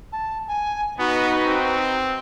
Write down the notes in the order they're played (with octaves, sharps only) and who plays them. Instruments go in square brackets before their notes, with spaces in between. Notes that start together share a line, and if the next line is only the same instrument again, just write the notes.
[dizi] A5
G#5
[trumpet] B3 [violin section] D#4 B4 [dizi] F#4
[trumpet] C4